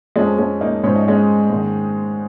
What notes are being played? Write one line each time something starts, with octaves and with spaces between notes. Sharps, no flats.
F2 F3 G#3 C#4
G#3 C#4
A#3 D#4
G#2 F3 C#4
D#4
G#3 C#4
G#2 D#3